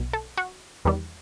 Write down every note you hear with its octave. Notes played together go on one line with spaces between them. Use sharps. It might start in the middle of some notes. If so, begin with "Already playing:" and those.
Already playing: B1 B2
A4
F#4
E2 D#3 G3